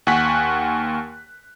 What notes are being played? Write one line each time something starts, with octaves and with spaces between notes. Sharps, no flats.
D#2 F#5 G#5 C#6 F#6 B6